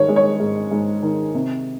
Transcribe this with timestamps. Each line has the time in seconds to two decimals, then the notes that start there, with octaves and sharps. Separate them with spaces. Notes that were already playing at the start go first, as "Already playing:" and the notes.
Already playing: G#2 D#3 C#5
0.09 G#3
0.16 C#5
0.40 G#2
0.71 G#2
1.03 D#3
1.34 C3